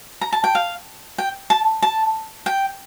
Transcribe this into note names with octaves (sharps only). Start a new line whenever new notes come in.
A#5
A5
G5
F5
G5
A5
A5
G5